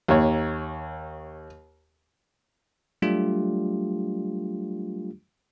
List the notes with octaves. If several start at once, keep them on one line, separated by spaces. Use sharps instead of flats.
D#2 C#5
F#3 G3 A3 D4 F4 G4